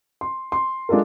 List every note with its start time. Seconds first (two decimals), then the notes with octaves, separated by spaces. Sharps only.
0.21 C6
0.52 C6
0.89 G#3 D4 F4 A4 A#4